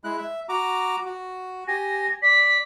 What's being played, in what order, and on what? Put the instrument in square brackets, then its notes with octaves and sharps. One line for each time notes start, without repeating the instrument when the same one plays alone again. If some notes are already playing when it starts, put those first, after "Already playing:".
[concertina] G#3 E4 F#6
E5
F#4 A#5 D6
F#4
[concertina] G4 G#5 [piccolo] A#6
[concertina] D5 [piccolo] B6